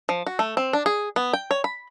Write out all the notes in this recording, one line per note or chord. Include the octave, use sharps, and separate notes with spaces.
F3
F#4
A3
C4
D4
G#4
B3
G5
C#5
B5